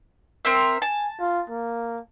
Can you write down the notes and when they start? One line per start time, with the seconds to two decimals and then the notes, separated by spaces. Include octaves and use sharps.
0.45 C4 A#4 E5
0.82 G#5 A5
1.20 F4
1.50 A#3